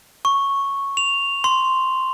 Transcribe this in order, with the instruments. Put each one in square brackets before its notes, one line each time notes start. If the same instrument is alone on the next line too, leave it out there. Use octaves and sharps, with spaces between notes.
[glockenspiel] C#6
F7
C6